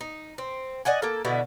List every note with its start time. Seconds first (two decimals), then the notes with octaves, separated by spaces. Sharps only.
0.01 D#4
0.38 C4
0.85 D5 D#5 F#5 G#5
1.02 A#3 A4
1.25 B2 D3 E4